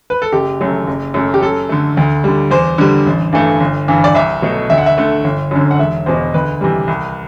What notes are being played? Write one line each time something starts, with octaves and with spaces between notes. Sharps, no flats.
B4
A4
F#1 G4
F#2 F#3 A3
F#1
F#2 F#3 A3
G4
F#2 A4
D3 A3
D2
D3 G3
E2 C5
D3 G3
A1
G2 E3 A3
G1
G2 E3
D5
C2 E5
B2 F#3 A3
D2 E5
F#5
E5
D3 A3
G1
F#2 D3
F#5
E1 E5
E2 B2 C5
D2 B4
C3 E3 G3
C2